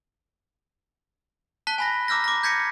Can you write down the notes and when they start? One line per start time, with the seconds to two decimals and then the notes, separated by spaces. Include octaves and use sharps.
1.67 A5 F#6 B6 G7
1.78 G#5 B5 A#6
2.08 A#5 D6 E6 F6 G6 A#6
2.24 D6 A#6
2.43 G6 G#6 A#6 B6 C#7 D#7